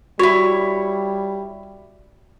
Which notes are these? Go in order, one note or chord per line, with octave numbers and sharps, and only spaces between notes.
G3 E4 F#4 C#5